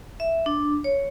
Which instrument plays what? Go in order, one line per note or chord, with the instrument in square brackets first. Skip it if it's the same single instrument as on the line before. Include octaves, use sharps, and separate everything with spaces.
[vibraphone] E5
D4
C#5